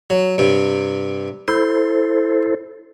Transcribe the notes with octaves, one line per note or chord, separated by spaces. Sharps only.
F#3
G2 C3
E4 A4 C5 C6